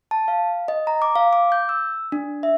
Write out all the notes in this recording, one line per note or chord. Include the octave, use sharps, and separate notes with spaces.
A5
F5
D#5
A#5
D6
F5
D6
G6
E6
D4
E5